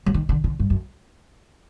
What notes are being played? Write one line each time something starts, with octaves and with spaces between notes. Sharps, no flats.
F#3
D#3
D3
D3
G2
F#2